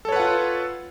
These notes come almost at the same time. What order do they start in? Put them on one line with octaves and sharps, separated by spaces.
A4 C#5 B4 F#5 F4